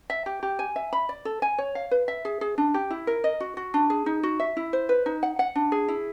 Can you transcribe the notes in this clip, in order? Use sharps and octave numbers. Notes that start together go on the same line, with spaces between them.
E5
G4
G4
G#5
E5
B5
D5
A4
G#5
C#5
F5
B4
E5
G#4
G#4
D4
G4
E4
A#4
D#5
F#4
F#4
D4
G#4
D#4
F#4
E5
E4
C5
B4
D#4
F#5
F#5
D4
G#4
E4